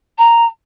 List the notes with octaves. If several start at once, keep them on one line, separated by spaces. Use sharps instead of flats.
A#5